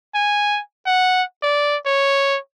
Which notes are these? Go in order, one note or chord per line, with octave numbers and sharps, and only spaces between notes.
G#5
F#5
D5
C#5